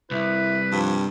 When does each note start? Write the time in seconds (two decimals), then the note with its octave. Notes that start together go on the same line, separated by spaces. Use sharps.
0.11 C2 E4 B4
0.72 G2 F3